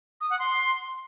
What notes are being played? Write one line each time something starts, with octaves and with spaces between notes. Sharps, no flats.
D#6
F#5
C6